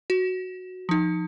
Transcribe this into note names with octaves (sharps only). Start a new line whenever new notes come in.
F#4
F3 D#4